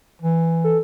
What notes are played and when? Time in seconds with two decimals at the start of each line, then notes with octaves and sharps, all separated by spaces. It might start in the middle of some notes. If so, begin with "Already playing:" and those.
0.22 E3
0.64 A4